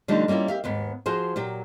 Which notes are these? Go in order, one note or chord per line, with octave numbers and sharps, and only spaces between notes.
D3 F3 G3 A3 D4 D#4
G3 A#3 C#4 E4 F4
G4 E5 F5
D#2 G#2 B3
F3 F#4 G#4 C5
A#2 F#3 G4